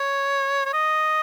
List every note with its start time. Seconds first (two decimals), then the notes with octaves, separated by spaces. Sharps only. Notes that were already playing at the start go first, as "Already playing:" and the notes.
Already playing: C#5
0.66 C#5
0.74 D#5